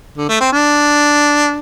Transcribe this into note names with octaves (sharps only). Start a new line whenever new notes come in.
D3
A3
C4
D4